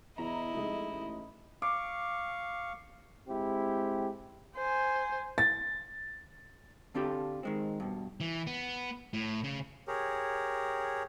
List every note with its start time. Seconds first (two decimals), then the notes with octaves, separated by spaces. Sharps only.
0.18 E2 E4 D#5 A#5
0.54 F1 G#3 A3 D#4
0.87 A1
1.62 F5 C#6 D6
3.28 G#3 C4 E4 G4
4.56 C5 G#5
5.38 A6
6.95 D3 C4 D4 F4 G4 A4
7.43 D#3 G#3 C4
7.80 G2 B2
8.20 E3
8.47 B3
9.13 A2
9.44 C#3
9.88 G4 G#4 A#4 C#5